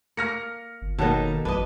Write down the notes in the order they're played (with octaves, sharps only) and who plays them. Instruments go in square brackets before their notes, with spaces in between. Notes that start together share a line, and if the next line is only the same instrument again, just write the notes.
[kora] A#3 [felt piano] F6 A#6 C#7
[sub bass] G1
[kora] B2 B4 D#5 [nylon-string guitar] D#3 A4 [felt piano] A#3 C#5 A5
[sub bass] A1 [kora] D4 [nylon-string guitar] B4 D#5